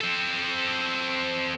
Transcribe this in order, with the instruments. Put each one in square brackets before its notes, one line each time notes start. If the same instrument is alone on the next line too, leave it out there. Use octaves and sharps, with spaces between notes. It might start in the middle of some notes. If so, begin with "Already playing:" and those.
[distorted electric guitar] C4 A4